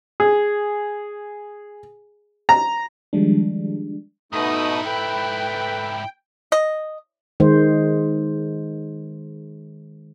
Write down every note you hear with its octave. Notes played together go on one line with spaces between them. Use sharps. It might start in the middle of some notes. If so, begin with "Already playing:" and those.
G#4
A#5
D#3 F3 G3 G#3 D4
G#2 B2 A3 D#4 E4 D#6
A4 B4 G5 B5
D#5
D#3 G#3 C5